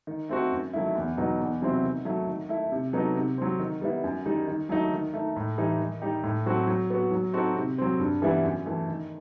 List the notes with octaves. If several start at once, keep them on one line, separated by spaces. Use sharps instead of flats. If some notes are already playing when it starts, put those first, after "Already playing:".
D#3
A3 C4 F#4
F#2
D#3 F#3 A3 E4
E2
B2 F#3 B3 D#4
E2
C3 F#3 C4 E4
D#3
F#3 A3
D#3
A3 E4
C3
F#3 B3 D#4 A4
C3
F#3 C4
D#3
G3 B3 E4
F#2
D#3 G3 D#4
D#3
F#3 A3 D#4
D#3
A3 D#4
A2
E3 G3 D#4
D#3
G3 D#4 G4
A2
F#3 C4 F#4 A4
F#3
B3 F#4
F#3
C4 D#4 F#4 A4
C3
F#3 C4
G2
E3 G3 B3 E4
F#2
E3 A3
D#3